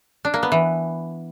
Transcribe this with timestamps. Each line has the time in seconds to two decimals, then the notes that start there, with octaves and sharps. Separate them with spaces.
0.25 D4
0.34 A#3
0.43 B3
0.52 E3